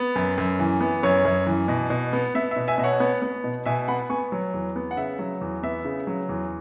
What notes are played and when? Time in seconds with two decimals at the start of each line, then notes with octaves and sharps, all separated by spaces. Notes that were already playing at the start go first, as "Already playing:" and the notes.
Already playing: B3
0.16 F#2
0.38 F#2
0.59 E3
0.81 B3
1.03 F#2 C#5
1.25 F#2
1.47 E3
1.68 B2
1.90 B2
2.13 B3
2.35 B3 E5
2.51 E5
2.56 B2
2.68 E5 G#5
2.78 B2 E5
2.83 C#5 F#5
3.00 B3
3.22 B3
3.44 B2
3.66 B2 E5 G#5
3.88 B3 F#5 B5
4.10 B3 G#5 C#6
4.32 F#3
4.54 E2
4.76 B3
4.91 F#5
4.97 C#3 E5
5.19 F#3
5.41 E2
5.63 B3 E5
5.85 C#3
6.07 F#3
6.29 E2